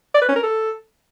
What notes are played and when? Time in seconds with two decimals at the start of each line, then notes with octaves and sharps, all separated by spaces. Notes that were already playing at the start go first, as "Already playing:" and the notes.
0.14 D5
0.21 B4
0.29 C#4
0.36 A#4
0.43 A4